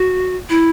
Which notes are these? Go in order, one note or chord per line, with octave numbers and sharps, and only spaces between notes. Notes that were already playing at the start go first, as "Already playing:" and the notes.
Already playing: F#4
E4